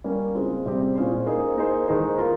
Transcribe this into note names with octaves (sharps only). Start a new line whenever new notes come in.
G3 A#3 C#4
C#3 G#3 C4 F4
C3 G3 C4 G4
A#2 G#3 C#4 G#4 C5
A#3 D#4 G#4 C5
A#3 D#4 G#4 C5
D#3 G#3 D#4 G#4 C5
A#3 F4 A#4